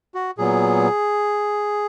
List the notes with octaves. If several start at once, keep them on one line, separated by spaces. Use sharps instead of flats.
F#4
A#2 F#3 B3 G#4